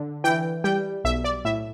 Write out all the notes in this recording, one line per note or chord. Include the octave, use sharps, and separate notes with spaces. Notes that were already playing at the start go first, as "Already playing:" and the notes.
Already playing: D3
E3 G5
G3 G5
B1 E5
D5
A2 E5